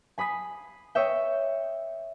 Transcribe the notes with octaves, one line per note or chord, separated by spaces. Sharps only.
G#5 B5 D#6 B6 C7
C#5 D#5 E5 G5